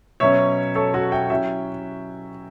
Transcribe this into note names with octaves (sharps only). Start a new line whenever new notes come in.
B2 F#3 C#4 C#5 E5
A4 C#5
F#4 A4
E5 G5
F#3 C#4 E4 E5 G5